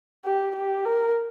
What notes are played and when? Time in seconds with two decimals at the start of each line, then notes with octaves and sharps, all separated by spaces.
0.25 G4
0.56 G4
0.85 A#4